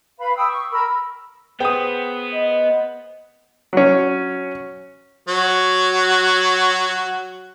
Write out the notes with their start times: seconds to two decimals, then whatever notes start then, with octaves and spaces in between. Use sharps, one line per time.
0.19 B4 F5 B5
0.36 G5 D#6 E6
0.49 C#6
0.72 A#4 B5 E6
1.60 B3 G#4 B4 C5 G5 D#6
2.34 D#5
3.73 F#3 C#4
5.28 F#3 F#4